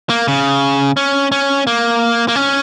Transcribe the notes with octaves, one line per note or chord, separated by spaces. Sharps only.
A#3
C#3
C#4
C#4
A#3
A#3
C#4